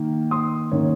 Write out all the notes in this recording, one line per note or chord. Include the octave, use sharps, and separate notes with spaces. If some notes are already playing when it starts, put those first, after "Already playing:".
Already playing: D#3 A#3
C6 D#6
D#3 A#3 C#4